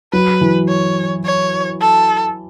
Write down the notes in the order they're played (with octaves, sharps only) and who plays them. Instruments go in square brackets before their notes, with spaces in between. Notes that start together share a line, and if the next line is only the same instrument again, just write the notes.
[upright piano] F#3 [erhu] B4
[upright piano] E3
[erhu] C#5
C#5
A4